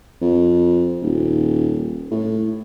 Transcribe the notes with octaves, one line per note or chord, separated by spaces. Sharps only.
F2
D#1
A2